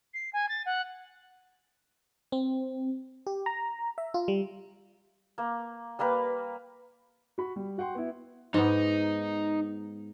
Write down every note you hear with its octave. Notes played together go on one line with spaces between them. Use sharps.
C7
G#5
A6
F#5
C4
G4
A#5
E5
F4
G3
A#3
G3 A#3 A#4 B4
F#4 B5
G3
F#4 F#5 G5 C6
B3 E4
G#2 B3 D#4